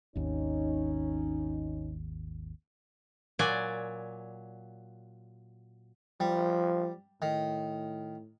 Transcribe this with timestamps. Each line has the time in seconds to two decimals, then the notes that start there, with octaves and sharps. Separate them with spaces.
0.16 G#1 D#2 C#4 D#4
3.39 A#2 F#3 D5 G#5
6.20 F3 G3
7.22 A2 D#3